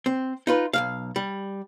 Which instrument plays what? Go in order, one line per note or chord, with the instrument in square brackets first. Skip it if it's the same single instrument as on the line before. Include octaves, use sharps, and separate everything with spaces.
[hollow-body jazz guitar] C4
D#4 F4 B4
B1 E2 F5
G3